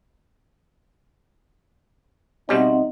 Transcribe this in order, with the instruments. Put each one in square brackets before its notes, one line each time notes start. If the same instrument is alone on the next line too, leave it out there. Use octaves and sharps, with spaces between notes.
[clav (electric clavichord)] B2 G3 C#4 [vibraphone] C4 E5 F#5 [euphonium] D#4